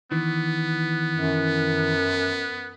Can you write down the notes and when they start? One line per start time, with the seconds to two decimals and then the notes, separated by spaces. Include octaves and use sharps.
0.12 D#3 E3 B3
1.16 F#2